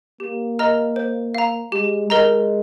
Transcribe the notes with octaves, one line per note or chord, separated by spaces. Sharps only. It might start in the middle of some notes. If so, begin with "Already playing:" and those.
A#3 G4
A#4 D#5 A#5 F6
C5
F5 A#5
G#3 G4
G#3 A#4 D#5 A#5